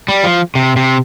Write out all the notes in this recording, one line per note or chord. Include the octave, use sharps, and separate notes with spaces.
G3
F3
C3
C3